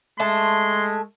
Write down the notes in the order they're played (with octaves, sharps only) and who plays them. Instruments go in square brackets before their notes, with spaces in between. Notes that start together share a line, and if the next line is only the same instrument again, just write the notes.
[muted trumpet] G#3 [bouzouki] A3 A5 [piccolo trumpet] C6